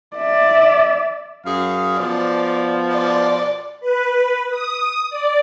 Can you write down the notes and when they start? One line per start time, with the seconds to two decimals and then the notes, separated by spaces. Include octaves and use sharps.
0.17 D5 E5
1.46 F#2 G#4 F5
1.99 B2 F3 D5
2.94 D5
3.80 B4
4.50 D#6
5.10 D5